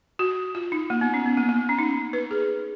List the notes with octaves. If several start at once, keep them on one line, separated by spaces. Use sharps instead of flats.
F#4
F4
D#4
A#3
B3
C#4
B3
A#3
A#3
C#4
D#4
B4
G#4